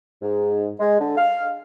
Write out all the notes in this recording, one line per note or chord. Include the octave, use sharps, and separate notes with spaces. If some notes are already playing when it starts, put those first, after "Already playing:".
G#2
G#3
D3
F5